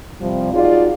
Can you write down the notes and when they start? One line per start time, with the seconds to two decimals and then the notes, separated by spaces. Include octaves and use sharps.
0.20 C3 F3 G3
0.53 D#4 F4 F#4 G#4 D5